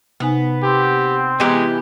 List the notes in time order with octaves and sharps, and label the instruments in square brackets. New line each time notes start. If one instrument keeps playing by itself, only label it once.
[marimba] C3 D#4 G#5 [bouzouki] B3
[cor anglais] C4 [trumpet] G4
[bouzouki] E3 E4 G4 [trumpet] G#3 [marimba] B3 A#5